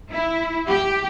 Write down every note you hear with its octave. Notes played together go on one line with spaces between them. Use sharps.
E4
G4